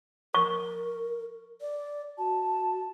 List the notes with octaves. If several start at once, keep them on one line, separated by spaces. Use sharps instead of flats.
A#4 C#6
D5
F#4 A5